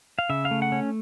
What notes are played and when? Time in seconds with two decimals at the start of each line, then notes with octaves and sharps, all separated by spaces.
0.19 F5
0.29 C#3 E5
0.45 F5
0.51 A3
0.62 F#5
0.72 C#4